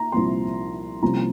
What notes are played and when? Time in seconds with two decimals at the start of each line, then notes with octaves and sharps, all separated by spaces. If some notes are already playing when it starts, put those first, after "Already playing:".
Already playing: A#5
0.12 C2 A#2 F3 C4 C6
1.02 C2 C3 F3 A#3 C#4 A#5